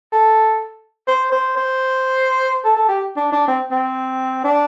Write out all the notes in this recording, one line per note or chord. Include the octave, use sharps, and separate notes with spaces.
A4
C5
C5
C5
A4
A4
G4
D4
D4
C4
C4
D4